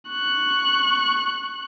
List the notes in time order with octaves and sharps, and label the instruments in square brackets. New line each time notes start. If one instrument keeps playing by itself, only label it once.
[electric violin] C#6 F#6